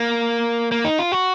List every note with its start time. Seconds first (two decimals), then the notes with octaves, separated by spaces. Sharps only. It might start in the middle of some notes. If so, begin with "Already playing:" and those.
Already playing: A#3
0.72 A#3
0.85 D#4
0.99 F4
1.12 F#4